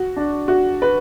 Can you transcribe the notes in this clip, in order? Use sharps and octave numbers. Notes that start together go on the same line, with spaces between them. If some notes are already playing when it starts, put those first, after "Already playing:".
Already playing: F#4
D4
F#4
B4